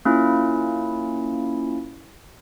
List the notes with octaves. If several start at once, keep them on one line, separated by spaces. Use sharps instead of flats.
A#3 C#4 E4 F4